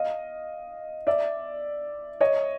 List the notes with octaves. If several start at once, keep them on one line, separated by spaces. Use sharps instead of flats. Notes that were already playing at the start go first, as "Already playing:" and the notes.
Already playing: D#5 F5
D5 E5
C#5 D#5